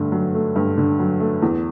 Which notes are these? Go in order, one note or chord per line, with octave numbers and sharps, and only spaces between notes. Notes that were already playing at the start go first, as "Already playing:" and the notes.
Already playing: G2 D3 A3
F#3
A3
G2
D3
F#3
A3
E2